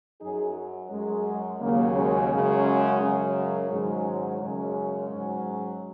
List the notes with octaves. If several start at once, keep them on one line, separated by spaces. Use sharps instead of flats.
F#2 F#3 D#4 G#4
F#2 F#3 G#3
D#2 C#3 F#3 A#3
G#3 C#4
F#2 C#3 F#3 G#3 C#4
F#2 C#3 F#3
G#2 D#3 F#3 G#3 C#4
F#2 C#3 F#3 G#3 C#4
G#2 F#3